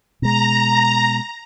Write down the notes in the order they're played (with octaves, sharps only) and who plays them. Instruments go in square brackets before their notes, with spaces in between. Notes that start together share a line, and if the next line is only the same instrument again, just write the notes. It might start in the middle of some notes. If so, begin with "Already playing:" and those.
[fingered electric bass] B2 G#3 [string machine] A#5